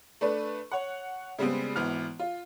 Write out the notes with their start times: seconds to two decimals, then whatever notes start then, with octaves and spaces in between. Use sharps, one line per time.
0.21 A3 D4 B4
0.72 C#5 F#5
1.39 C#3 G3 G#3 B3 C4
1.76 G#1 E3 B3 F6
2.20 F4